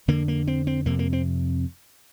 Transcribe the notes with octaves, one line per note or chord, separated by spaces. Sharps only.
F2 D3 A#3
A#3
C4
C4
F2 C3 A#3
A#3
C4